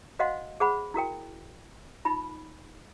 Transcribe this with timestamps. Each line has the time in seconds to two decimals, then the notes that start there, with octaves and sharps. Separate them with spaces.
0.19 F#4 C5 D#5 F5 F#5 C6
0.60 G#4 C5 F#5 B5
0.94 E4 F#4 A#4 G5
2.05 D#4 F4 B5